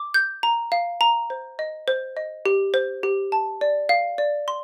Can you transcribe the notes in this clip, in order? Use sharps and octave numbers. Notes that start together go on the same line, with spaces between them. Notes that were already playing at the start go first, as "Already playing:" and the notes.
Already playing: D6
G6
A#5
F5
A#5
C5
D#5
C5
D#5
G4
C5
G4
A5
D5
F5
D5
C6